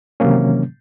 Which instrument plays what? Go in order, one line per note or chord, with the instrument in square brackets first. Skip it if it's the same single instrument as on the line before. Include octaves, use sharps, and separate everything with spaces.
[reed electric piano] C3 D#3 E3 F#3 A#3 C#4